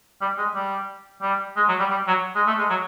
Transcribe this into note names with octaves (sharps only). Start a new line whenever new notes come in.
G3
G#3
G3
G3
G#3
F#3
G3
G3
F#3
G#3
A3
G#3
F#3